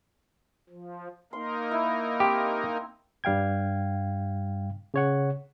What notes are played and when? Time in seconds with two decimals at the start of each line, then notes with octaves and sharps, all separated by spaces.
0.69 F3
1.33 A#3 D#4 A#4 C6
1.71 E4
2.20 C4 G4
3.24 G2 G3 F5 G5 G#6
4.94 C#3 C#5 F#5